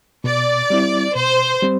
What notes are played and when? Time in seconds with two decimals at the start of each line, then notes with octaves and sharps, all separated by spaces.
0.24 B2 D5
0.70 G3 C4 E4
1.15 B2 C5
1.63 G3 C4